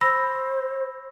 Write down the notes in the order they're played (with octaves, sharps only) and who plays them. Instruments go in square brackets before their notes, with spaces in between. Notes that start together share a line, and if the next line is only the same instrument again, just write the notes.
[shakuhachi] C5 [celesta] B5 E6 A#6